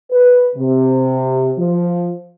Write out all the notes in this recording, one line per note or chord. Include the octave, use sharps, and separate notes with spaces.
B4
C3
F3